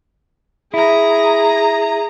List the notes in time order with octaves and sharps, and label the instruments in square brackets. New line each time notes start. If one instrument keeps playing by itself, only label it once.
[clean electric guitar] E4 [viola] G#4 A#5